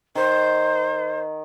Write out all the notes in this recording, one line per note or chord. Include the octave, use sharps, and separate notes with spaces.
D#3 C5